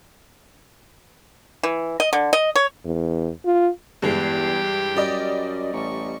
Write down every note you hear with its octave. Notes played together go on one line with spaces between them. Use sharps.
E3
D#5
D3
D#5
C#5
E2
F4
E2 G2 E3 G#3 G4
F#2 G3 D5 D#5
A1 C#6